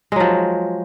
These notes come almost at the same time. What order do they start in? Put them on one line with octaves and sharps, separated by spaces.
G#3 F#3 F3